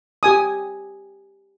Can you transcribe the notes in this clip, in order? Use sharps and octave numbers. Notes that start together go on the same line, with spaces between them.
G4 G#5 D#6